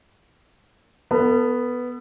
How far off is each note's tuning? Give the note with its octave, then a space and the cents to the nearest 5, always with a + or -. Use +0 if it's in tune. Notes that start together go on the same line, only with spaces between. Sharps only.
B3 +0 A4 +35